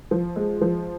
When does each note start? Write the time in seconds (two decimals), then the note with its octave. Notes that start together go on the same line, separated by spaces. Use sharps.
0.11 F3
0.36 G#3
0.61 F3